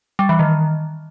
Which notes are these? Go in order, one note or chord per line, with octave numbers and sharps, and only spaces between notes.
G3
E3
D#3